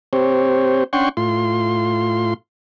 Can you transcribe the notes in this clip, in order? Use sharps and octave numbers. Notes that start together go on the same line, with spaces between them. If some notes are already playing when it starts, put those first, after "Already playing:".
C4 G4 C5 C#5
C#4 D4 F#5 G5 C6 C#6
A2 F4 C6